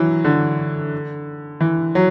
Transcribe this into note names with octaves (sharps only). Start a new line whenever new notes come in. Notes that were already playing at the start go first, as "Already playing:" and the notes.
Already playing: E3 F#3
D3
E3
F#3